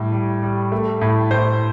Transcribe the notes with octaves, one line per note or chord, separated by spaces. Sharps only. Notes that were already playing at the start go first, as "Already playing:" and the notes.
Already playing: A2 G3
G3
G3
A3
A2
A2 C5